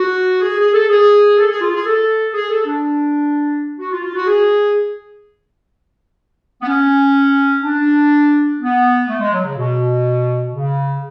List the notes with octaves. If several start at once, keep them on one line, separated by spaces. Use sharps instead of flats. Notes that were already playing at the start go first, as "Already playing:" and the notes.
Already playing: F#4
G#4
G#4
A4
G#4
A4
G#4
F4
G#4
A4
G#4
A4
D4
F#4
F4
F4
F#4
G#4
B3
C#4
D4
B3
A3
G#3
F#3
C#3
B2
C#3